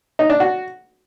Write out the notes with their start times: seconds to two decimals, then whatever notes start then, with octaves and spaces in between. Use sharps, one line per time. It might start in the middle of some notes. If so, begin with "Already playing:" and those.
0.19 D#4
0.30 D4
0.40 F#4